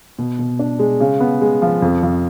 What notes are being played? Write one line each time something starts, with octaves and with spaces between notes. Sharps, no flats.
B2
B2
D4
G#3
C#3
B3
G#3
F3
F2
F2